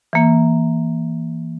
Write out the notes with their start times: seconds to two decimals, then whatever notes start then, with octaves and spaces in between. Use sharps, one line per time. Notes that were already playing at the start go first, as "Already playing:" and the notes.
0.13 E3 A#3